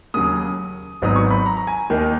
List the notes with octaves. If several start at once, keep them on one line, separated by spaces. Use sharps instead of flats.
D#2 C#3 F#3 D#6
G#1 G#2 F#3 B3 D#4 D#6
C#6
B5
A#5
A#5
G#5
D#2 D#3 A#3 D#4